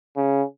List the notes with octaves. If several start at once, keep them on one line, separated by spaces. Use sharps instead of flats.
C#3